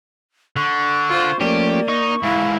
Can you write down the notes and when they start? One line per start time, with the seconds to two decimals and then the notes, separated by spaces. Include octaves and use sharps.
0.57 D3 C#6
1.09 F4 C5
1.41 F3 A3 A#3 C#4 G4 D5
1.88 D#4 C#6
2.23 G#2 E3 E4 F5